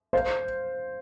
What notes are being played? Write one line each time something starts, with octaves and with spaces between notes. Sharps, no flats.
C5 F5